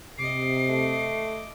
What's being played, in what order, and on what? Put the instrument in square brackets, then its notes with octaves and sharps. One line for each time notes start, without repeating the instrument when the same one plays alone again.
[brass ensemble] C3 [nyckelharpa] D#5 D6 [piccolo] C7
[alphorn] A3